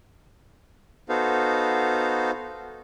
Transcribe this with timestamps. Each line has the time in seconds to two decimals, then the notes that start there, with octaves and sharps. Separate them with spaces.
1.09 B3 D#4 F#4 A4 C5 F5